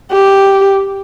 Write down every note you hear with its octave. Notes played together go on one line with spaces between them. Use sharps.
G4